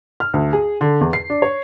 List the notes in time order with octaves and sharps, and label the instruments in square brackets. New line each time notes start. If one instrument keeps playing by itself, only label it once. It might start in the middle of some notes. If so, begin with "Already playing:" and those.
[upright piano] F6
D2
G#4
D3
E2
C7
D4
C#5